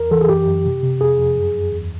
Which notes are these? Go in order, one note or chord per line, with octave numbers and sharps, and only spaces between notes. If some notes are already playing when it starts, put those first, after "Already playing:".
Already playing: E2 A#4
E3 A4
G#4
F#2 G4
F#2
C3
C3
F2 G#4
F2
F#2
F#2
E2